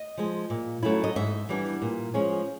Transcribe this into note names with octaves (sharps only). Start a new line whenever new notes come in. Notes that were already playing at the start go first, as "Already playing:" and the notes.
Already playing: D#5
F3 G#3
A#2
F#3 A3 C#4 E4
D#5
G#2 E5
E3 G3 B3 D4
A#2
F3 G#3 C#4